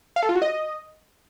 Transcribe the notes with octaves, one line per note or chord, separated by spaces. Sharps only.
F5
A4
F4
F#4
D#5